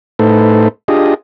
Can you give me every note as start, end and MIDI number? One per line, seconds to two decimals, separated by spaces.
0.19 0.68 45
0.19 0.68 57
0.19 0.68 63
0.19 0.68 69
0.19 0.68 71
0.19 0.68 72
0.88 1.14 62
0.88 1.14 65
0.88 1.14 67
0.88 1.14 68
0.88 1.14 75